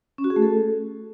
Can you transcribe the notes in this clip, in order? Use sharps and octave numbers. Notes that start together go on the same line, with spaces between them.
C#4
F#4
G#4
A3
A4